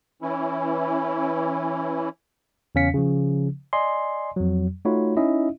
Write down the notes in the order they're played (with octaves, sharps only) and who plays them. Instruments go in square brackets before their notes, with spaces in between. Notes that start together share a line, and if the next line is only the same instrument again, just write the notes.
[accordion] E3 C#4 E4
[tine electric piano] E2 C#3 C#4 F5 B6 C#7
C#3 F3
D5 D#5 G#5 C6
F2 F#3
A3 D#4 F4 F#4 C#5 B5
C#4 D#4 E4 D#5 E5